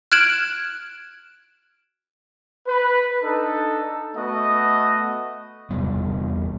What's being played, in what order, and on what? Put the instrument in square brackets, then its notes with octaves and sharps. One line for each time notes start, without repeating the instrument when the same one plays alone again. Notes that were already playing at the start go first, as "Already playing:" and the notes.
[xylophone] F6 F#6 G#6 D7 E7 F#7
[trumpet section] B4
D4 D#4 A4
A3 B3 F#4 D#5
[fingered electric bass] E2 C3 G3 B3